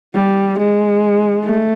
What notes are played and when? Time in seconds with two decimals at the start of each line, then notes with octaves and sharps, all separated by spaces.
0.15 G3
0.59 G#3
1.44 A3